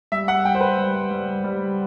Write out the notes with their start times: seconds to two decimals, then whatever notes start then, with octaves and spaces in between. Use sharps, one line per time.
0.12 G3 E5
0.28 F#5
0.45 G3 G5
0.55 C5
0.61 B4
0.78 G3
1.11 G3
1.44 G3